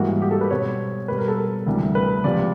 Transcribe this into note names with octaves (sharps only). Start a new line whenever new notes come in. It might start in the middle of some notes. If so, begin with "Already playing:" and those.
Already playing: G#2 E3 G3 A#3 F#4
G4
A4
B4
B2 G3 C4 C#5
B2 G3 B3 B4
A#4
A4
A#4
D2 C3 E3 G3
B4
C#2 C3 F3 D5